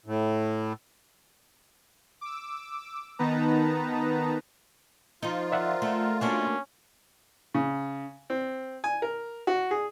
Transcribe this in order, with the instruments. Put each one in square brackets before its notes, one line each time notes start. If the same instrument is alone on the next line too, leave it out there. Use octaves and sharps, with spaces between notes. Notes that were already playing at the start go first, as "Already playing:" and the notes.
[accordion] A2
[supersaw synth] D6 E6
D#3 B3 D#4 B4 A5 A#5
[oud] F3 D#4 [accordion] F4
[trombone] A#4 [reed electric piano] D5 E5 F#5
[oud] A3
[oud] A#3 D4 F#4 [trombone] C#4
[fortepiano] C#3
C4
G#5
A#4
F#4
G#4